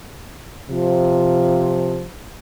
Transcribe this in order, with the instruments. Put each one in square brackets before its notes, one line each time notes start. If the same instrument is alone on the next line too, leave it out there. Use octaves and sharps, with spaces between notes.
[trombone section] C3 F3